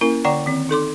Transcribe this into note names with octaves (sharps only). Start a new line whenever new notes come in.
A#3 C#4 E4 A#4
D3 D5 F#5 G5 A#5 C#6
D#3 C4
D#4 A4 C6 D6